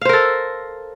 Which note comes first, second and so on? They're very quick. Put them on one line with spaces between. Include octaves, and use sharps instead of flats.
F5 C5 A#4 A4